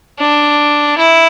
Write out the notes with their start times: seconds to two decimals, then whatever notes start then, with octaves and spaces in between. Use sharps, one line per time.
0.19 D4
0.98 E4